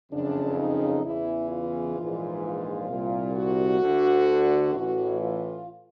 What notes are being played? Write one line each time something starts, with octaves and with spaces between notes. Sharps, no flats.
F#1 F2 C#3 D4
D#4
E2 C#3 E3 E4
F4
A#1 G#2 E3
F4
C2 A#2
F#4
D2 D3
A1 A2 E3 F#4
F4